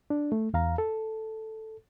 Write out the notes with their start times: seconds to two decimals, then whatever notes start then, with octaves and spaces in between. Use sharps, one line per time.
0.10 D4
0.32 A3
0.54 E2 F5 A#5
0.78 A4